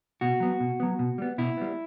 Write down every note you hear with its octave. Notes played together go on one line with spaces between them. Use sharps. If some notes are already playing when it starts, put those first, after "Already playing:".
B2 F#4
F#3 B3
B2
F#3 B3
B2
G3 B3
B2 E4
G3 B3